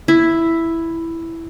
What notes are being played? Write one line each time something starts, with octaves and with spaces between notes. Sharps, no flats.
E4